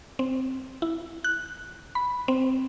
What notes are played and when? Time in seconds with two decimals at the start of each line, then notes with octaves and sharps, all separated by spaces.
0.19 C4
0.82 E4
1.24 F#6
1.95 B5
2.28 C4